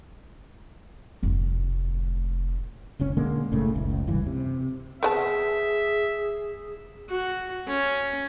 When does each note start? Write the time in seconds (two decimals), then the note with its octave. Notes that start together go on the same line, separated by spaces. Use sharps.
1.23 F1 A2
2.99 F#1 C#2 C#4
3.17 B2 D3 G#3 A#3
3.52 F#1 A2 C#3 A3
3.75 F#1 C#2
4.07 F1 C#2 G2 E3
4.27 C3
5.03 B3 G#4 D#5 E5 A5
7.09 F#4
7.67 C#4